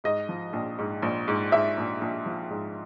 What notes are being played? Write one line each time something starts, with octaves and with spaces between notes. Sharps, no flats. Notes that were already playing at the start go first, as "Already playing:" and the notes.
G#2 D#5
F3
A#1
G#2
A#1
G#2
G#2 E5
A#1
A#1
F3
G#2